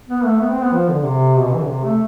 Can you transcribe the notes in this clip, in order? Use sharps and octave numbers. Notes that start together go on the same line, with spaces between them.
B3
A3
B3
C4
B3
F3
D3
C3
B2
C3
E3
D3
C3
A3